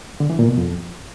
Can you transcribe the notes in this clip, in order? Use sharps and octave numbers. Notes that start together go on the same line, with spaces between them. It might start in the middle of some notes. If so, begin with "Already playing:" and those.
D3
E3
A#2
B2
F2